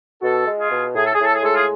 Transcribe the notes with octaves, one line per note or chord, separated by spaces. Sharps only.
B2 F#4 A4
G#3
F4 G#4
B2
A2 G#4
A4
G#4
A2
A4
G#4
G#3 A4
F4 G#4